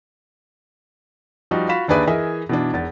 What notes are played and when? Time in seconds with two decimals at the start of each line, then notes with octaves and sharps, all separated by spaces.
1.51 F3 G3 D#4 F#4
1.69 F4 F#4 F5 B5 B6 E7
1.88 D#2 D4 G#4 B4 D5 E5
2.07 E3 G#4 A#4 D#5 E5
2.49 B2 E3 D4
2.73 E1 E2 A6